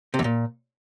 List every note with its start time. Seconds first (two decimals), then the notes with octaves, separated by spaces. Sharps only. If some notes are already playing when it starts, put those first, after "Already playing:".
0.14 C3
0.19 E2
0.24 A#2